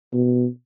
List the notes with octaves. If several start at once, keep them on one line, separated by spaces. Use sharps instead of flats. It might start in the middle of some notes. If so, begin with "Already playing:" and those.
B2